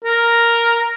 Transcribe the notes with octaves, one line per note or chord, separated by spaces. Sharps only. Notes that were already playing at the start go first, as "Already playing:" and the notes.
A#4